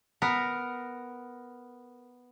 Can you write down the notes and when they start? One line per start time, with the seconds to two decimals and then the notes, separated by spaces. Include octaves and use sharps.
0.22 B3 A#4